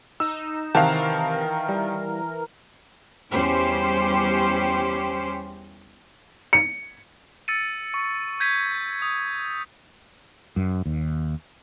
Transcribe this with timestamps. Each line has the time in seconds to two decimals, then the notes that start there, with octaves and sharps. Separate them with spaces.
0.20 D#4 E6 E7
0.75 C3 D#3 E3 A#4 F5 F#5 A5
1.69 G3
3.32 E2 G3 C#4 G4 C5
6.53 C#7
7.48 E6 A6 C#7 D#7
7.94 C#6
8.40 G6 G#6 B6 D#7
9.02 D#6
10.56 F#2
10.86 D#2